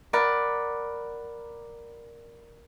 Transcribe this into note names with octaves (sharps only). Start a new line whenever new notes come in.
A#4 D5 F#5 B5